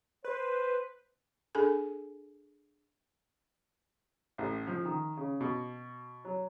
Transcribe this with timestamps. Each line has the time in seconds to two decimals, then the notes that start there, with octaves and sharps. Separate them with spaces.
0.24 B4 C5
1.55 D4 G#4 A4 G#5
4.38 A1
4.67 F3
4.85 D#3
5.17 C#3
5.41 B2
6.25 F#3